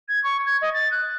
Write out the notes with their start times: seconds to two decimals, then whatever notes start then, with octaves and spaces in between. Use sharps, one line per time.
0.08 G#6
0.23 C#6
0.45 G#6
0.61 D#5
0.73 A6
0.91 F#6